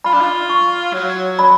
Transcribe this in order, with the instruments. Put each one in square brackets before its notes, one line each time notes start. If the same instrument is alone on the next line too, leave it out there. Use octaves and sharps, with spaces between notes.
[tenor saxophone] F4 [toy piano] B5
[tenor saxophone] D4
F4
[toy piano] C#6
[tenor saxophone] F#3
[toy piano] B5